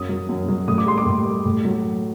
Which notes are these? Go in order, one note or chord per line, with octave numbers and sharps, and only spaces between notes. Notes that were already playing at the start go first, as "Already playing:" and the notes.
Already playing: F#2 D#6
F#3
F#2
F#3
A2 D#6
D6
G3 C6
D6
A2
G3
A2
F#3